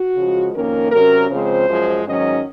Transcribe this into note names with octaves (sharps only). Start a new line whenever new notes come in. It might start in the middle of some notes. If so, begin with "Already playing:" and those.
Already playing: F#4
C#3 F3 G#3
F2 D#3 A#3 C#4 A#4
C3 F#3 C#4 A#4
C#3 F3 G#3 C4 C5
F#2 F3 G#3
G#2 D#3 F#3 C#4 D#5